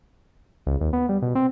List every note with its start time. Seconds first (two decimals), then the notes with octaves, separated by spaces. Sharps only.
0.67 C#2
0.81 D#2
0.93 B3
1.09 G3
1.22 B2
1.35 C4